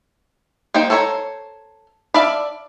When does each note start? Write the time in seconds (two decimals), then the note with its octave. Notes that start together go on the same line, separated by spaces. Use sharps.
0.74 A#3 D#4 C5 G5
0.90 A4 C5 C#5 G5 A#5
2.14 D5 E5 F5 A5 B5